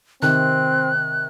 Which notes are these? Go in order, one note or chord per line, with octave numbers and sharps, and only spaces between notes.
C3 D#3 C4 F#6